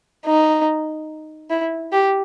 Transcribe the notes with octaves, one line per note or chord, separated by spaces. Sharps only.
D#4
E4
G4